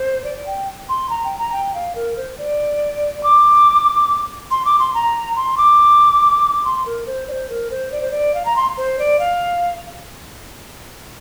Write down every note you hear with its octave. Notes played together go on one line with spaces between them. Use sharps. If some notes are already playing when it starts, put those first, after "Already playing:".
Already playing: C5
D5
G5
C6
A#5
G5
A#5
G5
F5
A#4
C5
D5
D6
C6
D6
C6
A#5
C6
D6
C6
A#4
C5
D5
C5
A#4
C5
D5
C5
D5
F5
A#5
C6
C5
D5
F5